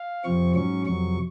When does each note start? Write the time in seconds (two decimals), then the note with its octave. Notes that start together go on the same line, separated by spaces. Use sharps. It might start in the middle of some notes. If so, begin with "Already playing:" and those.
Already playing: F5
0.24 F2 C3 F3 C4 C#6
0.55 G#2 F#3 C#4 C#6
0.86 F2 C3 F#3 C#6